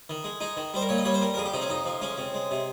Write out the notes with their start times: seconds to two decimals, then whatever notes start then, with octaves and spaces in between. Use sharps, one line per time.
0.10 D#3
0.24 G#3
0.41 G#3 D#4
0.57 D#3
0.74 G3 C5
0.81 A#4
0.89 A#2 C#5
0.98 D#5
1.05 G3 C#5
1.14 C5
1.21 G3 A#4
1.34 A#4
1.37 F2 G#4
1.46 G4
1.54 C3 D#4
1.62 C#4
1.70 F2 D#4
1.85 F3
2.02 G#3 C#4
2.18 C3
2.34 G#3
2.51 C3